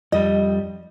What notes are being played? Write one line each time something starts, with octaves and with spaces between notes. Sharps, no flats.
F2 G3 D#5